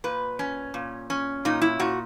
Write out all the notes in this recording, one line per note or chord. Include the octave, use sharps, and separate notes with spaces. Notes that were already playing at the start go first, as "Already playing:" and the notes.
A#2 B4
C#4
A#2
C#4
A#2 D#4
E4
A#2 F#4